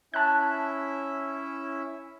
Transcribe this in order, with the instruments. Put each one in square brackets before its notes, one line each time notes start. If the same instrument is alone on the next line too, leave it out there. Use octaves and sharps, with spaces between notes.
[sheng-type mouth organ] C#4 E4 E5 [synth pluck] A5 F#6